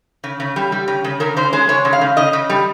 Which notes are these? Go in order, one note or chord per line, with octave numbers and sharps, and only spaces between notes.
C#3
C#3
G3
G3
C#3
C#3
C#3 A#4
C#3 C5
G#3 C5
G#3 C#5
C#3
F5
C#3
C#3 D#5
C#3
G3